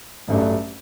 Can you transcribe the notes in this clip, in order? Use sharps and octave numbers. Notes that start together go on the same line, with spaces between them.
A1 G2 F#3 A3 D4